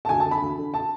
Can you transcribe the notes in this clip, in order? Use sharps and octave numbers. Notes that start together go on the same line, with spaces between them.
A5
D2 G#5
A5
D3
B5
D2
D3
A5